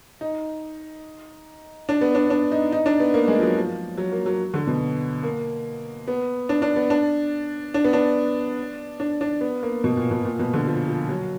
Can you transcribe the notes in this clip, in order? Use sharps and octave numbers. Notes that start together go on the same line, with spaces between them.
D#4
D4
B3
D4
D4
D#4
D#4
D4
B3
A#3
G#3
F3
F#3
F3
F#3
A#3
F#3
D3
B2
A#3
B3
D4
D4
B3
D4
D4
B3
D4
D4
D4
B3
A#3
B2
A#2
B2
A#2
B2
D3
F3
F3
F#3